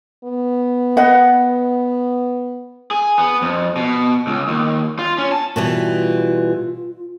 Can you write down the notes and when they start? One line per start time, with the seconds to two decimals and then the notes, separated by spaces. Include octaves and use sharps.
0.24 B3
0.97 B4 D#5 F#5
2.91 G#4
3.18 B3
3.42 F2
3.77 B2
4.27 C#2
4.48 D#2
4.99 F4
5.18 C#4
5.32 A5
5.56 B2 E3 G3 F4